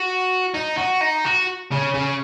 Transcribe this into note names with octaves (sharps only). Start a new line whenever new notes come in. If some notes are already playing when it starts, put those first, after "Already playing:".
Already playing: F#4
D#4
F#4
D#4
F#4
C#3
C#3